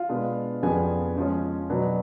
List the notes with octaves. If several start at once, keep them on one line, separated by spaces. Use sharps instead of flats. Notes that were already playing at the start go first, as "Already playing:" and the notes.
Already playing: F4 F5
B2 G#3 B3 D4
F2 C#3 F3 B3 D4 G#4 G#5
C#3 F3 G#3 C#4
B2 F#3 B3 D4